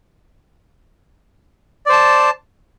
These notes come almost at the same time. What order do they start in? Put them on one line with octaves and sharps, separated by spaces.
D5 C5 A5